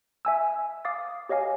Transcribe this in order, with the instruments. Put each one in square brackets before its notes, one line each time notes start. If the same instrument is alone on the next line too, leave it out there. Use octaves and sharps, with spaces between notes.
[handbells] E5 G#5 E6
F5 D6 D#6 A6
G4 C#5 D#5 F5 G#5